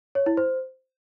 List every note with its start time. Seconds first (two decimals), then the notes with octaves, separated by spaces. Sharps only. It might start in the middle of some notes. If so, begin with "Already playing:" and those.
0.15 C#5
0.26 E4
0.37 C5